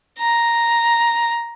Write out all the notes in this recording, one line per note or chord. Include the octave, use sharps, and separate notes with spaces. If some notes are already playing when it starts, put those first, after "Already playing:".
A#5